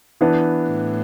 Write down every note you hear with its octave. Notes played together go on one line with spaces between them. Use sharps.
E3 B3 D4
A2